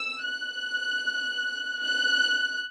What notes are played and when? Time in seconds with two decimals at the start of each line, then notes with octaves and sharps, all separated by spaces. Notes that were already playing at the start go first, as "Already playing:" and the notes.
Already playing: E6
0.23 F#6
1.83 F#6